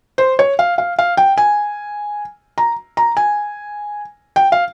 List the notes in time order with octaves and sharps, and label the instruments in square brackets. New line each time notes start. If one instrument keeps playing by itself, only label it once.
[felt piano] C5
C#5
F5
F5
F5
G5
G#5
A#5
A#5
G#5
G5
F5